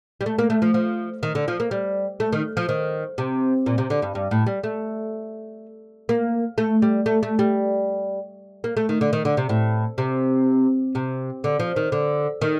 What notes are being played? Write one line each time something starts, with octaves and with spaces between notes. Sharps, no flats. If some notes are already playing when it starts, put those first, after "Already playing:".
G3
A3
A#3
A3
F3
F3
D#3
D3
F3
A#3
G3
A3
D#3
F3
D#3
C3
A#2
C3
D3
G2
G2
A2
G3
A3
A#3
A3
G3
A3
A3
G3
A#3
A3
D#3
D3
D#3
D3
C3
A2
C3
C3
D3
F3
D#3
D3
D#3